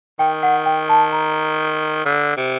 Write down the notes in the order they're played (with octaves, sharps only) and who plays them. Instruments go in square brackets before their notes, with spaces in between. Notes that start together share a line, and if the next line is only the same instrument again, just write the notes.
[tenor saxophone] D#3 [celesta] G5
[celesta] F#5
G5
A5
A#5
[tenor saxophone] D3
C3